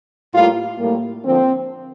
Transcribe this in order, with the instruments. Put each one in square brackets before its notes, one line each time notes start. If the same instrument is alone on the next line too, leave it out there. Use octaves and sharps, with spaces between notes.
[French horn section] A2 G3 A#3 F4
A2 G3 A#3
D3 F3 A#3 C4